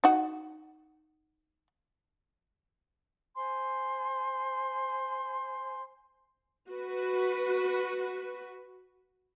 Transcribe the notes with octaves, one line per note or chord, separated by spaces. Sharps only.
D#4 F#4
C5 G#5 C6
F#4 B4